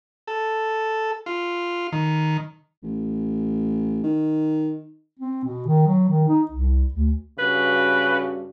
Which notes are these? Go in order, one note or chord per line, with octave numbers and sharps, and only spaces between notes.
A4
F4
D#3
A1
D#3
C4
B2
D#3
F#3
D#3
D#4
C2
D2
G2 C#3 F#4 B4